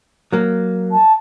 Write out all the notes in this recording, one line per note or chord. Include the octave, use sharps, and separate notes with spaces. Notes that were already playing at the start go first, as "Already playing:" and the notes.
F#3 A#3
A5